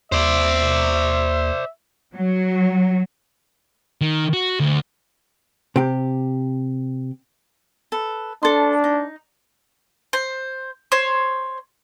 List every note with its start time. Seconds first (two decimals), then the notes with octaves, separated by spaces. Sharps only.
0.12 D#2 C5 D5 E5
2.15 F#3
4.01 D#3
4.33 F#4
4.60 D2
5.76 C3 G4
7.92 A4 B4
8.43 D4 A4 C6
8.84 D#4
10.13 C5
10.92 C5 C#5